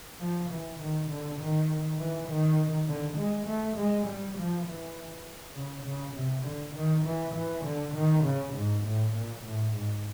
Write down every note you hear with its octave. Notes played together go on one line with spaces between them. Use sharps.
F3
E3
D#3
D3
D#3
E3
D#3
D3
G#3
A3
G#3
G3
F3
E3
C#3
C#3
C3
D3
D#3
E3
E3
D3
D#3
C#3
G#2
A2
A#2
A2
G#2